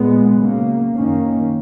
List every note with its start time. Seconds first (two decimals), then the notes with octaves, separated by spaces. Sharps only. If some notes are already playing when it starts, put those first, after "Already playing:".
Already playing: A#2 G#3 B3
0.37 C#3 F#3 A#3
0.94 F#2 D#3 A#3 C#4